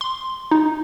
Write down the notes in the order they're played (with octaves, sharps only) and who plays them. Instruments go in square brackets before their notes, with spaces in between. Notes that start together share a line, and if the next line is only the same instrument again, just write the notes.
[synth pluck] C6
D#4